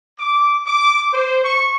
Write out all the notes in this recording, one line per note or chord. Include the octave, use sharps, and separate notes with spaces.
D6
D6
C5
C#6